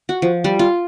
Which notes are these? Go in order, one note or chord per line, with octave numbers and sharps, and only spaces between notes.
F#4
F3
G3
F4